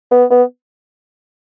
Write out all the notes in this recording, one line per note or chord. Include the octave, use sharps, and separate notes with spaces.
B3
B3